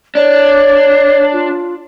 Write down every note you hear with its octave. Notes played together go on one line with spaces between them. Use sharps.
D4 C#5
F4